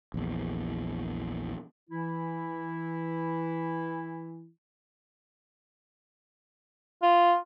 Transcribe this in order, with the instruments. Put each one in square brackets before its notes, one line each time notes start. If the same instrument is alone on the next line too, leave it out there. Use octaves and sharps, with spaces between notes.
[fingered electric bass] A#1 E2
[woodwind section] E3 E4
[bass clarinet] F4